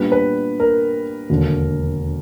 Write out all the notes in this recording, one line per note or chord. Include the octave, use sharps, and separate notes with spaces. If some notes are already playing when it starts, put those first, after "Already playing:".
Already playing: A#2 G3 B3 D4 B4
B4
A#4
E1 D#2 D3 F#3